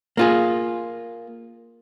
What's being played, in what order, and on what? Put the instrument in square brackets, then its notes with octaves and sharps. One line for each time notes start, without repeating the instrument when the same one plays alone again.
[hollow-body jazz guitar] A#3 F4 G#4